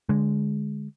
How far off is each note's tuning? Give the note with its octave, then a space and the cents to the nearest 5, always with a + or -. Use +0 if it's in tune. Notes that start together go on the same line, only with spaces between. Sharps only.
D3 +0 G#3 +0